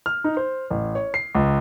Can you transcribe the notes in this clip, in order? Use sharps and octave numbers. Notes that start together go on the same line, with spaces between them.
F6
D#4
C5
A1
C#5
C7
C#2